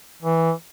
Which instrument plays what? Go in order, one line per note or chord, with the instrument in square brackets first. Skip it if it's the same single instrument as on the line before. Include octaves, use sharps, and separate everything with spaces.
[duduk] E3